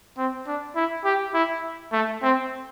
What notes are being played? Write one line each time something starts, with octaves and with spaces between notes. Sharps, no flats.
C4
D4
E4
G4
E4
A3
C4